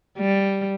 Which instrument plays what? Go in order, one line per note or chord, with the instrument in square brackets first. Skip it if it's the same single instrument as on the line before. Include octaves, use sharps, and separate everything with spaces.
[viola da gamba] G3